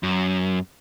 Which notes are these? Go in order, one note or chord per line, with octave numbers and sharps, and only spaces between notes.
F#2